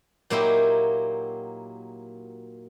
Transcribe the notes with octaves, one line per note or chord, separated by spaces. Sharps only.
A#2 F#3 A#3 D#4 E4 G4